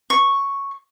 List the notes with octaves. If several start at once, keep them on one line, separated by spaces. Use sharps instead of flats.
C#6